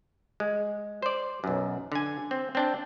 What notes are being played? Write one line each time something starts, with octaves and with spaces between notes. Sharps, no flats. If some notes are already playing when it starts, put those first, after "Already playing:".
G#3
C5 D5
B1 F#2
D3 G#5
C4
C4 D4 G5